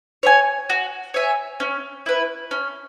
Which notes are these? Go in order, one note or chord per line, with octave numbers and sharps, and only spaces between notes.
C#5 E5 G#5
F#4
C#5 E5 G#5
C#4
E4 B4
C#4